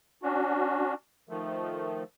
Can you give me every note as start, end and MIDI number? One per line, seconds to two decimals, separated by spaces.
0.23 0.94 61
0.23 0.94 62
0.23 0.94 66
1.29 2.03 51
1.29 2.03 53
1.29 2.03 57